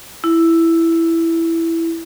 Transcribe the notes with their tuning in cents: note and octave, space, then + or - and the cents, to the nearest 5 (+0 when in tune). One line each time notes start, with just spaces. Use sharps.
E4 +5